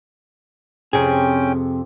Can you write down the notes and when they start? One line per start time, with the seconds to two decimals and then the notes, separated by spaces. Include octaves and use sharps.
0.93 F2 C3 C#4 G#4 G5